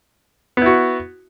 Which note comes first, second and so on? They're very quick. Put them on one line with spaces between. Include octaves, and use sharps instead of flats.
B3 E4 F#4